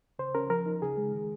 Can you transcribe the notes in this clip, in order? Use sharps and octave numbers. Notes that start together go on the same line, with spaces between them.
C#3 C5
C#4 A#4
F3 A#4
D#4
C#3 G#4
G#3
D#3